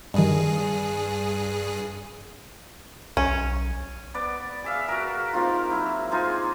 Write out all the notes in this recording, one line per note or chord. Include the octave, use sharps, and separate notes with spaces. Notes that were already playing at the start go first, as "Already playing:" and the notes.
G2 D#3 G3 G#4
B1 C#4
B3 B4 D5
G#4 E5 F5
F#4 A#4
A#3 C4 D#4 F4
F#3 E4
D#4 F4 G#4 C5